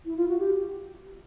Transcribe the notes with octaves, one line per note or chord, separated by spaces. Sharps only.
E4
F4
F#4
G4